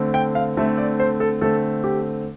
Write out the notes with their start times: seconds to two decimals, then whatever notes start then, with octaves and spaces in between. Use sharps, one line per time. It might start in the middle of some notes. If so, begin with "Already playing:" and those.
Already playing: D3 A3 C4
0.14 G5
0.35 F5
0.57 D3 A3 C4 E5
0.78 D5
1.00 C5
1.20 A4
1.41 D3 A3 C4 A4
1.84 G4